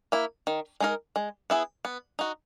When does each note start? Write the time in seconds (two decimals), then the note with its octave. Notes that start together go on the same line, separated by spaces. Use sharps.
0.12 A#3 E4
0.47 D#3
0.80 G#3 D#4 A#4
1.16 G#3
1.50 B3 E4 G#4
1.85 B3
2.19 D#4 F#4